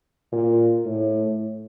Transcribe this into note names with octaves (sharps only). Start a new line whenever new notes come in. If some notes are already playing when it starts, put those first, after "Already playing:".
A#2
A2